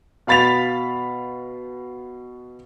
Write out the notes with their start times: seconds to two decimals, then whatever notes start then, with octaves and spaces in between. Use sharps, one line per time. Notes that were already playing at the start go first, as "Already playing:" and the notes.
0.27 B2 F5 B5 A6 B6 F7